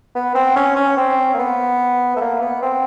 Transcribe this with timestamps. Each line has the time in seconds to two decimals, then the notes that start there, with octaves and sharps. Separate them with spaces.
0.15 B3
0.35 C4
0.56 C#4
0.76 C#4
0.97 C4
1.34 A#3
1.39 B3
2.16 A3
2.21 A#3
2.41 B3
2.62 C4